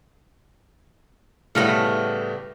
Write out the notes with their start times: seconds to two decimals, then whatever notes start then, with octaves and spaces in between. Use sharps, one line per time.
1.55 A2 C#3 G3 A3 B3 A#6